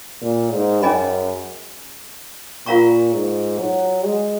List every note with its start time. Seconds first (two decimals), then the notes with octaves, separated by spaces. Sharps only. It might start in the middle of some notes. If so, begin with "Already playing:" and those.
0.21 A#2
0.52 G#2
0.82 F#2 C#4 G#4 D#5 G#5 B5
2.66 A#2 F4 A#4 F5 A#5 C#6
3.12 G#2
3.58 F#3
4.04 G#3